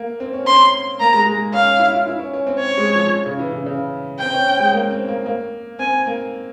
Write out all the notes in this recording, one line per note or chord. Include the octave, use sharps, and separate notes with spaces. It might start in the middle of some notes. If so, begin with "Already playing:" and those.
Already playing: A#3
C4
C#4
C4 C6
A#3 A#5
G#3
G#3
C#4 F5
C#4
E4
F4
E4
C#4
C#4
C4
C#5
G#3
F3
C#3
E3
C#3
C#3
C4 G5
C#4
C4
G#3
A#3
C4
A#3
A#3
C4 G#5
A#3